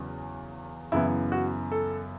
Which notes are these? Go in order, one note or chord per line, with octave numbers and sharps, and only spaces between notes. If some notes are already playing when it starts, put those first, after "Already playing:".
Already playing: E2 C#3 F#3
F#2 C#3 E3 B3 E4
F#4
A4